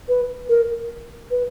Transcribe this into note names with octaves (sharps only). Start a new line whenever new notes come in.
B4
A#4
B4